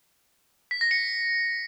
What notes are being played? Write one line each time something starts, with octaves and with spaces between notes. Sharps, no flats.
B6
A#6
C#7